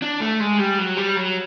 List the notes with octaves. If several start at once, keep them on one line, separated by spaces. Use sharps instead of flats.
D4
A3
G#3
G3
F#3
G3
F#3